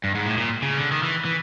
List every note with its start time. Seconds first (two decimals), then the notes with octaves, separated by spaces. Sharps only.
0.04 G2
0.15 G#2
0.26 A2
0.37 A#2
0.62 C#3
0.77 D3
0.91 D#3
1.03 E3
1.25 E3